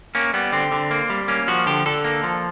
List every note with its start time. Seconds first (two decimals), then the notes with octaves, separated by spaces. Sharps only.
0.15 A#3 C#4
0.34 G3 B3
0.52 D3 C4
0.72 D3
0.91 A#3
1.10 G3
1.28 A#3 C#4
1.48 F3 F#4
1.66 D3 G4
1.86 D3 A4
2.04 A#3
2.23 F3